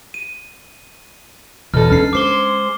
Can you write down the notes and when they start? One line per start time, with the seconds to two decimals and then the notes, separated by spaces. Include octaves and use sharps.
0.14 D#7
1.74 E2 B2 D#4 A4 F6
1.90 C#4 D4 F6 C7
2.13 G#3 C5 D6 C7 G7